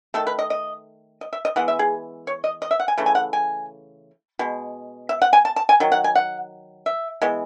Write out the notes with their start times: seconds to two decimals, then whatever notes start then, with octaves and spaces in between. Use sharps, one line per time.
0.14 D#3 A3 A4
0.27 B4
0.39 D#5
0.50 D#5
1.21 D#5
1.33 E5
1.45 D#5
1.56 E3 G#3 B3 F#5
1.68 E5
1.79 G#4
2.27 C#5
2.44 D#5
2.62 D#5
2.71 E5
2.80 F#5
2.88 G#5
2.98 C#3 E3 A3
3.06 G#5
3.15 F#5
3.33 G#5
4.39 B2 G#3
5.09 E5
5.22 F#5
5.33 G#5
5.45 A5
5.56 A5
5.69 G#5
5.80 D#3 F#3
5.92 F#5
6.04 G#5
6.15 F#5
6.86 E5
7.22 E3 G#3 B3